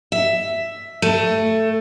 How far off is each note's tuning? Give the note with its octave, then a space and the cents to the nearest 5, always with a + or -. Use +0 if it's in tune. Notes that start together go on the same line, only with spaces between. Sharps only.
E5 +5
A3 +10